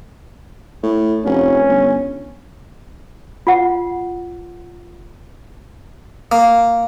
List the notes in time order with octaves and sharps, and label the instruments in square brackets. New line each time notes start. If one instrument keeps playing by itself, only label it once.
[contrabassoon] A2
[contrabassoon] F1 [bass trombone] C#4
[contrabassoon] G1
[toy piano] F4 F#5
[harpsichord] A#3